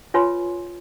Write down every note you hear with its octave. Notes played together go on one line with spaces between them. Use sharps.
F4 B4 C#5 G#5 C6